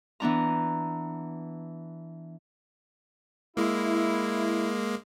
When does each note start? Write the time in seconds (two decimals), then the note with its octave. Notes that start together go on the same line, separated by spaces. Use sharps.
0.20 E3 B3 D4 A#5
3.57 G#3 A#3 E4